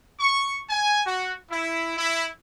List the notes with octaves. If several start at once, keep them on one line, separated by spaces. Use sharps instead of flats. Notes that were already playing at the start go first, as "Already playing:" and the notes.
C#6
G#5
F#4
E4
E4